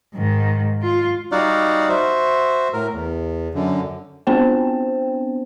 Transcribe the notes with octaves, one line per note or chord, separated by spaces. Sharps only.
G#2 D#3
F4
G3 D#4 F#4 D5 F5 F#5
F#4 C5 E5
A2 A#4
E2
F#2 D3
B3 C4 D4 C5 G5